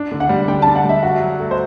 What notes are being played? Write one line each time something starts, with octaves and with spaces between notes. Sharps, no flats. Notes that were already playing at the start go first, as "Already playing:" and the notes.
Already playing: D4
D3
F#5
G3
D3 G5
A5
D3
F#5
G3 E5
F#4
F#3
A3
C5